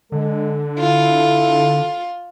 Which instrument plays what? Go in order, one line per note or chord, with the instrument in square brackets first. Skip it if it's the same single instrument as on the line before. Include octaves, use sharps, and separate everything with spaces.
[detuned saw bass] D3 [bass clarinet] G#3 [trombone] A4
[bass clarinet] E4 [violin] F4